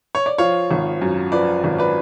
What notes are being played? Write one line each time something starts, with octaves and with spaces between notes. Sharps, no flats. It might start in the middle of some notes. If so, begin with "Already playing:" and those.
C#5
D5
F3 C#5 F5
G#1
F#2
F3 B4 D5
G#1
B4 D5